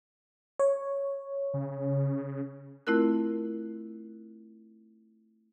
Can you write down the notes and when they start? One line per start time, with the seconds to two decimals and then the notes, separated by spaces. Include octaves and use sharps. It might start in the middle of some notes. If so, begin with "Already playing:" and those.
0.59 C#5
1.54 C#3
2.87 A3 C4 E4 F4 A#4 F#6